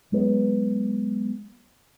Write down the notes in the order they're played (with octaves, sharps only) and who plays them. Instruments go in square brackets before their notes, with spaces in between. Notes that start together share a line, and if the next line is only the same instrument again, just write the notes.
[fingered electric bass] F#3 G#3 B3